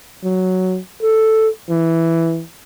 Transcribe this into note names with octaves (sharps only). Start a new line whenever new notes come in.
F#3
A4
E3